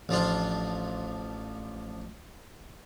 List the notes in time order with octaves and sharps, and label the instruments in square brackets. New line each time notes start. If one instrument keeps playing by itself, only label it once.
[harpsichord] A1 F3 D4 F4